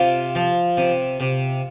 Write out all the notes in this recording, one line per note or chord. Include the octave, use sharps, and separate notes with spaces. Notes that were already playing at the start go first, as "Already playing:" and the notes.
Already playing: C3 F4
F3
C3
C3